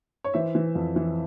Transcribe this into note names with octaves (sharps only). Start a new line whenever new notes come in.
C#5
E3 C5 E5
E3
F2
E3